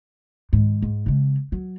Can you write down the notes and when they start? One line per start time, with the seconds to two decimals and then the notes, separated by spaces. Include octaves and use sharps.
0.53 G#2 D#3
0.82 G#2
1.06 C#3 G#3
1.52 F#3